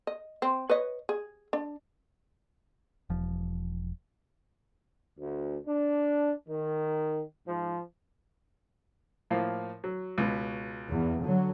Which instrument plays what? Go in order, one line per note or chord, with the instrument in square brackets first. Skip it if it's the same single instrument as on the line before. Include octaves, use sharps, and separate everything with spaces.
[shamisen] D#5
C4
B4 C#5 D#5
G#4
D4
[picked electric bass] E1 F3
[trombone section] D2
D4
D#3
G#2 F3
[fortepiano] A2 F3 A#3
F#3
C#2 B2
[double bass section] E2
D3 F#3